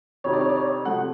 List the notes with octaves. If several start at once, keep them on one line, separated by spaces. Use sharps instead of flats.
F2 C3 D#3 C#5
D5
C#5
D5
C#5
C3 F3 A3 C4 F#5